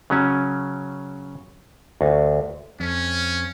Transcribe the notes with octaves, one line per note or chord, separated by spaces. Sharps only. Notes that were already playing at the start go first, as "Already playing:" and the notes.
C#3 F#3 C#4
D2
F2 C#4